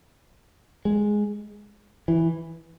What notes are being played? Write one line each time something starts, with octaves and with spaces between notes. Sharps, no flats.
G#3
E3